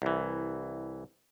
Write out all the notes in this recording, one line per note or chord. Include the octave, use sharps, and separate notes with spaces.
C2 E3